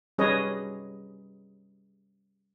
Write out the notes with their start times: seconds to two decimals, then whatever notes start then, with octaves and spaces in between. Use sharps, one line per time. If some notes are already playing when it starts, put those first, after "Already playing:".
0.18 G3 C#4 G#4 B4 C#5 D#5